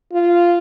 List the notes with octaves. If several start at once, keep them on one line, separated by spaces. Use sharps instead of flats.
F4